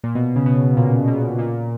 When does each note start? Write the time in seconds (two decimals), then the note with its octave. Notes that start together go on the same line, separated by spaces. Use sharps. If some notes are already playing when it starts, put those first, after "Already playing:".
0.04 A#2
0.15 B2
0.36 C#3
0.46 B2
0.77 A#2
1.08 B2
1.39 A#2